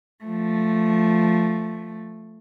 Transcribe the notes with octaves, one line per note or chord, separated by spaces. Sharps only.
F3 A3